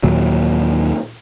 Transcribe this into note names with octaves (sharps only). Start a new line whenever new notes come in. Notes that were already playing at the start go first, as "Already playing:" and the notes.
D#2 A#2 F#3